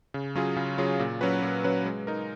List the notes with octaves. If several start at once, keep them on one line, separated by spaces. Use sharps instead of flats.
C#3
F#3 C#4 F4 G#4
C#3
F#3 C#4 F4 G#4
A#2
F#3 C#4 F#4 B4
A#2
F#3 C#4 F#4 B4
G#3
D#4 A#4